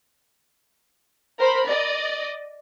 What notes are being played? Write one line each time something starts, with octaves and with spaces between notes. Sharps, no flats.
A#4 C5 B5
D5 D#5